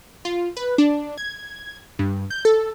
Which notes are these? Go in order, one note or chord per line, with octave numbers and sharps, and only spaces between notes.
F4
B4
D4
G#6
G2
G6
A4